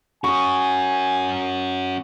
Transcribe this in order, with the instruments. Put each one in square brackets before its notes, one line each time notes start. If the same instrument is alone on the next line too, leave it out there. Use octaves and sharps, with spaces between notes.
[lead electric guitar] C#4 F#4 [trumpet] G#5 [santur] C#6 D#6